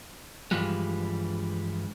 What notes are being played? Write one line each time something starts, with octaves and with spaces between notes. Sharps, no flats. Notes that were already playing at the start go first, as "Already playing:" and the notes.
G2 E3 F3 G3 G#3